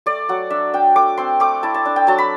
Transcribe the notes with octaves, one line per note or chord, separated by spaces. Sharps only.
A3 D5
F#3 F#5
D4 E5
D4 G5
A3 D6
C4 C6
A3 D6
E4 A5
A5
D4
G5
F#3 A5
B5